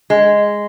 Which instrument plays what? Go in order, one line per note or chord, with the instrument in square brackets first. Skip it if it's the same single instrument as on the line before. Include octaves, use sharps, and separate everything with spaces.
[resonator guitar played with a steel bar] G#3